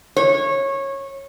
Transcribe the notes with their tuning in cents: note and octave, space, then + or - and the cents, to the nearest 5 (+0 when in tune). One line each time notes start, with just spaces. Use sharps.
C#5 -20